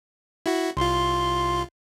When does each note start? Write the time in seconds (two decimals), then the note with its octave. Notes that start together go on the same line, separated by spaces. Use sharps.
0.46 E4 F#4
0.77 C2 F4 C6